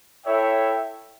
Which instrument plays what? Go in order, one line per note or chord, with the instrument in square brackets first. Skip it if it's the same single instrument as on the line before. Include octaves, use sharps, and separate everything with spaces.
[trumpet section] E4 A4 C#5 E5 G5